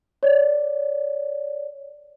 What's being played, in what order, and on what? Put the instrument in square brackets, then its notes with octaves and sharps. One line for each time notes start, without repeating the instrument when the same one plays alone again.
[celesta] C#5 D5